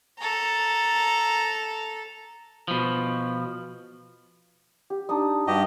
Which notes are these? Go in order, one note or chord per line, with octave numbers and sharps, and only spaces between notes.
A4 A#5
B2 F3
G4
D4 D#4 D#6
G2 F#4 G4 D#5